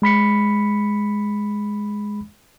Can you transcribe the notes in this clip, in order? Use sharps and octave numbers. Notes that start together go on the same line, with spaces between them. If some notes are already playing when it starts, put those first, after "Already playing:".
G#3 B5 B6 C#7